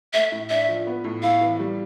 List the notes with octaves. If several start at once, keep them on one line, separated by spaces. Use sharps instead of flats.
A3 E5
A2
D4 E5
F3
B3
A2
E4 F5
E3
G3